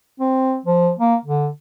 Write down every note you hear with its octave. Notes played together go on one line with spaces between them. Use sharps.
C4
F3
A#3
D3